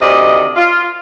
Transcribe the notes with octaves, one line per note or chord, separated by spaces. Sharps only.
D2 C3 D#3 D5 D#5
F4